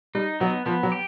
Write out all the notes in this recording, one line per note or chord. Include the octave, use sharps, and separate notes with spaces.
G3 D#4
F#3 B3
F3 B3
F#3
G4